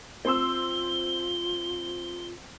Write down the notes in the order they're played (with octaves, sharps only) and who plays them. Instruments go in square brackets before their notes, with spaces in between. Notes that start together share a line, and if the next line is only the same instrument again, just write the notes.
[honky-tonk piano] C4 C6 E6 [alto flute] F4 [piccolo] G7